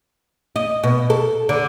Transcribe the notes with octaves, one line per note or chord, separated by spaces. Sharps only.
D#5
B2
A4
D3